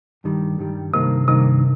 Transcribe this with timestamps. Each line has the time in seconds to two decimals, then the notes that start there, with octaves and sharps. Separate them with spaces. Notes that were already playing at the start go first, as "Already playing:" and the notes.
0.24 G2 D#3 G3
0.59 G2 D#3 G3
0.94 G2 C3 D#3 A#3 D#4
1.28 G2 C3 D#3 A#3 D#4